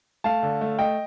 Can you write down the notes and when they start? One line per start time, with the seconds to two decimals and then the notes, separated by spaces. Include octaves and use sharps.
0.24 A3 F5 A5
0.43 D3
0.61 A3
0.79 A3 D#5 G5